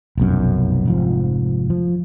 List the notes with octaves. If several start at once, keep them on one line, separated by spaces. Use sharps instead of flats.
F1 B1 F#2
F1 G#2 F3
F3